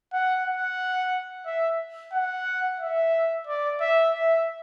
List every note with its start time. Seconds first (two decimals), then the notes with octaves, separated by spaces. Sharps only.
0.13 F#5
0.46 F#5
1.46 E5
2.13 F#5
2.80 E5
3.47 D5
3.80 E5
4.13 E5